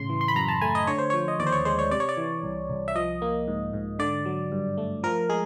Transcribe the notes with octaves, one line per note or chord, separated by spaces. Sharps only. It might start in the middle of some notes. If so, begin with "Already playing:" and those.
Already playing: A2 C#3 C6
E3
C6
B5
F#2 A#5
A5
A3 G#5
D#5
D3 C#5
C5
F3 C#5
D#5
D#2 D5
C5
C#5
G#3 C5
C#5
C3 D5
C#5
D5
E3
C2
C2
E5
F3 D#5
A#3
G#2
G#2
D3 D5
F#3
G2
A3
F3 A#4
G#3 G#4